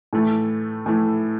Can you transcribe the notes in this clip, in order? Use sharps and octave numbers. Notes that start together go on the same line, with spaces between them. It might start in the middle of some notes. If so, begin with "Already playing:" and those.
A2 E3 A3
A2 E3 A3